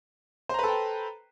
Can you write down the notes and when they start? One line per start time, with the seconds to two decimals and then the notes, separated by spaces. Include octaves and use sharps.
0.49 C5
0.54 A#5
0.59 B4
0.63 A4
0.68 G5